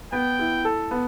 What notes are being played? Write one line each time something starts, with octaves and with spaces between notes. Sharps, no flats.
B3 G5
E4
A4
B3